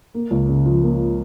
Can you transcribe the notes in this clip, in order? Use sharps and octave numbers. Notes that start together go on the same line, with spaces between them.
A#3
C#2
C#3
F3
A#3